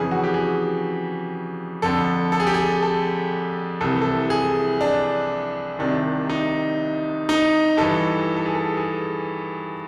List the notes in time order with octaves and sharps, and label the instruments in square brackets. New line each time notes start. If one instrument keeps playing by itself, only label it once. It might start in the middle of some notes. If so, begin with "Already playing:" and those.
Already playing: [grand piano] F2 C#3 E3 G#4
F#4
G4
G#4
F2 D3 A4
A4
G#4
G4
G#4
A4
C2 C3 E3 A4
A4
G#4
D4
C2 C3 D#3 D4
D#4
D#4
G2 E3 A4
A4
G#4
A4
G#4